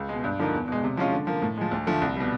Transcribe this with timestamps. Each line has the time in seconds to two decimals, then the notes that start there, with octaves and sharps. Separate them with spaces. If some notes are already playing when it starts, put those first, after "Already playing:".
Already playing: C#2
0.09 B2 G#3
0.24 G2
0.39 D3 F3 A#3 D#4
0.53 E2
0.68 B2 G#3
0.84 C3
0.97 F3 G#3 C#4 F4
1.12 D3
1.27 F3 A#3
1.42 A2
1.58 F3 G#3
1.71 D2
1.87 D3 F3 A3
2.01 C2
2.16 B2 G3